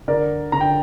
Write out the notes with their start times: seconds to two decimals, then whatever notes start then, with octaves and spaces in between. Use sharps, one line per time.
0.08 D3 A#4 D5
0.52 D3 A#5
0.61 G5